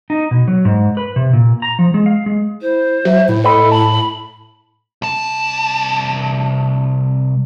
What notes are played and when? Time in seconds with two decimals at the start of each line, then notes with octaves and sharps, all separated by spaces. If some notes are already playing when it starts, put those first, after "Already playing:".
0.10 D#4
0.31 B2
0.48 F#3
0.65 G#2
0.97 B4
1.16 C3
1.33 A#2
1.62 A#5
1.79 F3
1.94 G#3
2.06 F5
2.26 G#3
2.62 E4 C5
3.05 F#3 E5
3.29 A2 E4
3.44 E4 A4 B4 D#5 B5
3.72 A5 B5
5.02 C2 A5